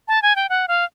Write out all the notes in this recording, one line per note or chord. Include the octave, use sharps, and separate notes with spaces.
A5
G#5
G5
F#5
F5